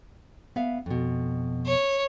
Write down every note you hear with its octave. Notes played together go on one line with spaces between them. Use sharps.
B3 E5 F5
F2 B2
C#5